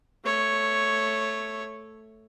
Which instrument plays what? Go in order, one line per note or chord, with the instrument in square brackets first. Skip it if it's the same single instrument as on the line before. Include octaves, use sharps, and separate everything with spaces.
[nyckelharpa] A3 C#5